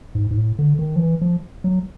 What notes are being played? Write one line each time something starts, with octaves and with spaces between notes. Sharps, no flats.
G#2
G#2
A2
D3
D#3
F3
E3
F3
F#3